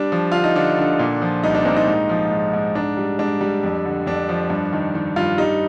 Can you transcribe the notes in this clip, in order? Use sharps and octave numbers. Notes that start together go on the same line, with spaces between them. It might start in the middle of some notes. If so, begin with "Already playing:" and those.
Already playing: G3 D4
F3
D3 F4
D#4
D3 D4
D3
A#2
F3
C2 D#4
D4
A#2 C4
D#4
G#2
F3
G#2
G#2
G#2 D4
G3
G#2 D4
G3
F2
D3
F2 D4
F3
G2
D#3
D#3
G2 F4
G3 D#4